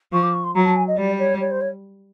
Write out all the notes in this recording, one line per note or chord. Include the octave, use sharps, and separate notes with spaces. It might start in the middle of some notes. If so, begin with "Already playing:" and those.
F3 C#6
D6
C#6
C6
F#3 A#5
A5
G#5
D#5
G3 D5
C#5
C#5
C5
C#5